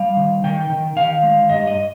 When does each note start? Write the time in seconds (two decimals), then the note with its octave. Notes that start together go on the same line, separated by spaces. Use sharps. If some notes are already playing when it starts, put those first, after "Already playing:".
Already playing: G3 F5
0.17 D#3
0.44 D#3 G5
0.70 D#3
0.96 D#3 F5
1.23 G#3
1.49 G2 D#5
1.67 D#5